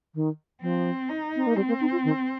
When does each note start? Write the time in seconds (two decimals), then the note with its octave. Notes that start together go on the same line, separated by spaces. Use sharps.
0.15 D#3
0.62 F3 C4
1.09 D#4
1.36 C4
1.47 A#3
1.56 G3 C4
1.68 A#3
1.81 D#4
1.92 F4
2.04 D#3